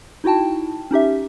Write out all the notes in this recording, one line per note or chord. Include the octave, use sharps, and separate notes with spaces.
D#4 E4 F#4 G5 A5
C#4 D#4 G4 E5